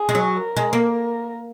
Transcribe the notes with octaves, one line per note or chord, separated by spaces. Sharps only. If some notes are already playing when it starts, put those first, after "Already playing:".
Already playing: G#4
G#3
F#3
A#4
G#3
A#3
A#4